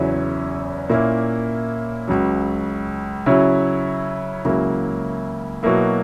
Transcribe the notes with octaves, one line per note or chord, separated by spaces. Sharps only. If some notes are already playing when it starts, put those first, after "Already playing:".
Already playing: E2 C#3 F#3 C#4 E4
A#2 A#3 C#4 E4
C#2 C#3 F#3
C#3 F#3 C#4 E4
C#2 C#3 F#3 A#3 E4
B2 F#3 A#3 E4